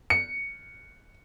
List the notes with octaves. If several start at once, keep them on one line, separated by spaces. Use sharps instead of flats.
C#7